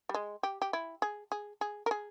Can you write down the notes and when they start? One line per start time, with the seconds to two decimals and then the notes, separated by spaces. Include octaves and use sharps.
0.09 G3
0.14 G#3
0.43 G4
0.62 G4
0.73 E4
1.02 G#4
1.32 G#4
1.61 G#4
1.86 A#4
1.91 G#4